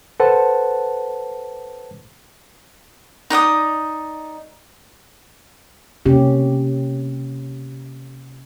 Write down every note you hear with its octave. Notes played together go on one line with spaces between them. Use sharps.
A4 B4 C5 F#5 A5
D#4 D5 F#5 D#6
C3 A#3 C#4 G4